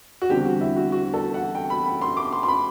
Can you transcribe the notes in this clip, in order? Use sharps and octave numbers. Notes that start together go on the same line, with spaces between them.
F#4
E2 D3 G3 C4 G4
F#4
E4
F#4
F#4
A4
F#5
G5
B5
B5
C6
D6
C6
C6
B5